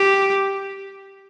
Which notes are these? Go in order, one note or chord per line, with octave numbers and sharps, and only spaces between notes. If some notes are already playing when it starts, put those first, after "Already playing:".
Already playing: G4